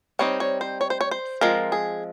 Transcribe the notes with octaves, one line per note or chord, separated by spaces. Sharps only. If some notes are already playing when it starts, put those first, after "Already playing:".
G3 C4 D#4 C#5
C#5
C5
C#5
C5
C#5
C5
F3 G#3 C4 A#4
G#4